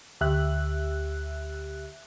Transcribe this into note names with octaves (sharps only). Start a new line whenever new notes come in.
D2 G4 E5 F#6